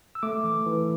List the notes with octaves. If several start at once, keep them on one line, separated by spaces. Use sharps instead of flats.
E6
A3 D6
E3
E3